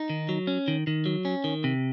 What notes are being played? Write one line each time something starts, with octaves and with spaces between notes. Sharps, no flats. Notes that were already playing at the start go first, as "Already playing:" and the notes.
Already playing: D#4
D#3
F#3
C#4
D#3
D#3
F#3
C#4
D#3
C3